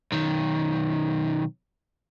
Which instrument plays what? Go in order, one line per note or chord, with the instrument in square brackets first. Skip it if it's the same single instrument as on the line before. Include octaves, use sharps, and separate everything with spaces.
[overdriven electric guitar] B1 D#3